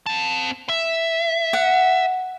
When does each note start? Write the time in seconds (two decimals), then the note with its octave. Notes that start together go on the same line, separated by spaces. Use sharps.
0.06 C4 A5
0.69 E5
1.53 F#5